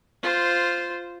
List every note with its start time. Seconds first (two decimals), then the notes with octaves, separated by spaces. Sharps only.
0.23 F4 C5